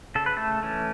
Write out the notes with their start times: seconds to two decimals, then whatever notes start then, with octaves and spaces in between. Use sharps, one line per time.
0.15 C#3 A4
0.26 B4
0.37 A3 A4
0.63 E3 A3 C#4